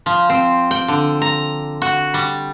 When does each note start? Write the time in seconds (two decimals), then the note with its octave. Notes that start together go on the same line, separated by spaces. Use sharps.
0.06 F3
0.29 C4
0.71 G5
0.88 D3
1.22 A#5
1.82 F#4
2.14 G3